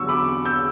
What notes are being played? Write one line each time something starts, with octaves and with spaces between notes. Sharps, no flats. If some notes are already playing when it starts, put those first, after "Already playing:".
Already playing: E2 D3 F#3 C#6 E6
B5 D6
E6 G6